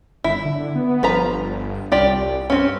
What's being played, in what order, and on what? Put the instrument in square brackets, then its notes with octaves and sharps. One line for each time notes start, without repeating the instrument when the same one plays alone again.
[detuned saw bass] G1 [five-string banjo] E4
[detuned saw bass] D3
B3
[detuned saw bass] G1 [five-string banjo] F3 B4 A#5
[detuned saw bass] C2 [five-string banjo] F4 G4 D5
[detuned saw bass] G2 [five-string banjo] C4 C#4